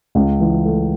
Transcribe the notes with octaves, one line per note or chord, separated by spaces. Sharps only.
C#2
E3
A3